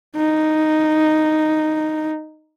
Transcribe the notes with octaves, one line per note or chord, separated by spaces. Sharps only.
D#4